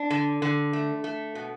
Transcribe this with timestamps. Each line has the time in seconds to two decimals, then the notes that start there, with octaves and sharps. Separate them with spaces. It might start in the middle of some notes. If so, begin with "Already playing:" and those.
Already playing: D4
0.10 D3
0.42 D3
0.73 A3
1.04 A3
1.35 B2